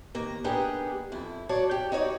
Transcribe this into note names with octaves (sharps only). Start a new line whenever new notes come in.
D#2 A#3 A#5
A#3 B3 D4 D#4 G4 G#4
F2 E4
F#3 C#5 D5 A5
G4
D#4 F#4 C#5 D5